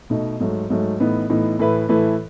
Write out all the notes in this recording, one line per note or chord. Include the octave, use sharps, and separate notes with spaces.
B2 A3 D#4
G#2 F#3 A3
G#2 F#3 A3
A2 E3 B3 D#4
A2 E3 B3 D#4
A2 E3 A3 E4 B4
A2 E3 A3 E4 B4